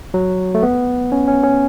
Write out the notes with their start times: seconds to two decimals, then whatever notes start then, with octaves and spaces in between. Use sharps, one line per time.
0.14 F#3
0.55 A3
0.63 B3
1.12 C#4
1.28 C#4
1.44 C#4